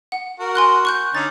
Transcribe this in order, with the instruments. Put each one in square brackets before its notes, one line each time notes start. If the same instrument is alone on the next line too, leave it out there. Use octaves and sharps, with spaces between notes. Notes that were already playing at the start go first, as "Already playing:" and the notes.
[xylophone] F#5
[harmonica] F#4 A#4
[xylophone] G#5 C6 F#6
C#6 F#6 G6
[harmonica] D3 C#4 D#4 [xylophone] A6